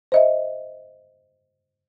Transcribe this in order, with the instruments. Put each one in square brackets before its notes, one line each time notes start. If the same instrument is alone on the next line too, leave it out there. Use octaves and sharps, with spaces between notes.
[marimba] C5 D#5 E5